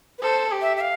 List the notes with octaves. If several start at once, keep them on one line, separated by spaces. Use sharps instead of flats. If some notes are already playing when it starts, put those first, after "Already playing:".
B4
A4 C5
G4
E5
E5
F5